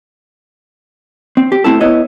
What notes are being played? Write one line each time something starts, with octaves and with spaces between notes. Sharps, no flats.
C4
G4
A3 C4 E4 A4
B3 E4 C#5 D#5